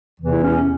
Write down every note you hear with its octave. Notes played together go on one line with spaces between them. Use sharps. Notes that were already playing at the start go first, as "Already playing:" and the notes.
E2 C3 E3
E4
C#4